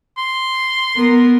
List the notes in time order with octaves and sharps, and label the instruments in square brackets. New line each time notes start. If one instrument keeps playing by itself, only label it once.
[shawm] C6
[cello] B3 A#4